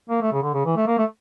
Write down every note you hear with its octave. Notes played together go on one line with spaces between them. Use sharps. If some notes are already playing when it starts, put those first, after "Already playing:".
A#3
A3
C#3
D3
C#3
E3
A3
A#3
A3